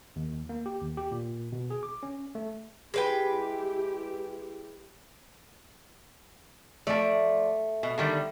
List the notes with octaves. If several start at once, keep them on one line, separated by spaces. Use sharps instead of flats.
D#2
A#3
G4
D#2
G4
A#2
B2
G#4
D6
C#4
A3
G#3 E4 G4 B4 G5
F3 A3 D5
B2
D3 D#3 G3